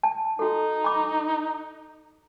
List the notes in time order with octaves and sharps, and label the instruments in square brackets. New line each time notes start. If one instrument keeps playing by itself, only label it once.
[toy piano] A5
[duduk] D#4 [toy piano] F#4 A4
[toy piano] B5 D6